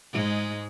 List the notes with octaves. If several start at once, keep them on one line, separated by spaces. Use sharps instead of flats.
G#2 G#3